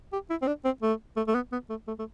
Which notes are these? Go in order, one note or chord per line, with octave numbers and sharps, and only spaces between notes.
G4
E4
C4
D4
C4
A3
A3
A3
B3
B3
A3
A3
A3